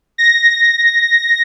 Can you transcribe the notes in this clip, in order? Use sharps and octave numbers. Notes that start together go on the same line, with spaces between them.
A#6